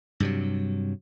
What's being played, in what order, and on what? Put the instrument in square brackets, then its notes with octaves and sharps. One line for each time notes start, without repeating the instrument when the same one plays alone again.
[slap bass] G2 C3 F#3